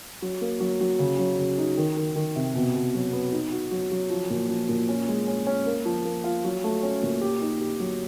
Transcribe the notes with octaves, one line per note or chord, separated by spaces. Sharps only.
F#3
A#3
F#3
F#3
C#3
F#3
C#3
D#4
D#3
D#3
D#3
C3
B2
B2
F#3
B3
D#4
F#4
F#3
F#3
F3
A#2
F3
A#2
C#4
G#3
C#4
C#4
A#3
F3
A#3
F4
F#3
A3
C#4
A#2
G4
D#4
G4
F#3